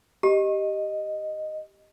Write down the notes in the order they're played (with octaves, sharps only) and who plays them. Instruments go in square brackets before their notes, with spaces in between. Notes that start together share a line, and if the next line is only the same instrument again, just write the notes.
[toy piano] G4 [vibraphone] D#5